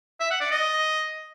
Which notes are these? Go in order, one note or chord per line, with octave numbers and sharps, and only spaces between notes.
E5
F#5
D5
D#5